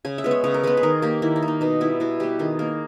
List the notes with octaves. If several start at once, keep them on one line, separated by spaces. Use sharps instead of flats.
C#3 G#5
E5
G#3 B3
C#5
C#3 C#5
A#4
G#3 B3 B4
G#4
D#3 A#4
A#3 G4
D#3 E4
D#4
A#3
D#4
B2 D#4
G3 B3 E4
B2 E4
G3 B3 G4
D#3 G#4
A#3 A#4